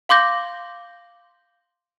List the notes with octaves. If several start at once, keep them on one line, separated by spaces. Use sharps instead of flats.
F5 C6 D6 G6 A#6